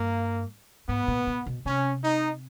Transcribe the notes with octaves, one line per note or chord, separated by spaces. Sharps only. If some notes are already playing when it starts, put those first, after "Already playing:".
Already playing: G2 A#3
G#2 B3
A#2
A#2
B2
C3 C#4
D#4